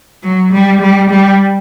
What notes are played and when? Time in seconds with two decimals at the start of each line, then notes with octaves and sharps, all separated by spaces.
0.23 F#3
0.53 G3
0.81 G3
1.10 G3